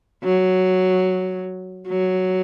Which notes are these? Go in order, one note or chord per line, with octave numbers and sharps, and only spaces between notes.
F#3
F#3